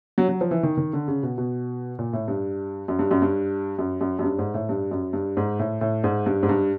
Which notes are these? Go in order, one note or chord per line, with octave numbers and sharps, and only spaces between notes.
F#3
F#3
F3
E3
D#3
D#3
D3
C#3
B2
B2
A#2
A2
G2
F#2
G2
F#2
G2
F#2
F#2
F#2
G2
G#2
A2
G2
F#2
G2
G#2
A2
A2
G#2
G2
G#2
G2